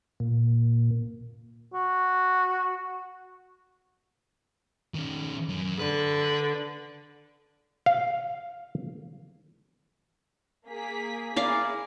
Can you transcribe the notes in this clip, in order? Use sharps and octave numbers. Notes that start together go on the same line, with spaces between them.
A#2
F#4
D#3 C#4
F#2
D3 B4
F5
A#3 G#4 B6
E4 G#4 D5 F5 A#5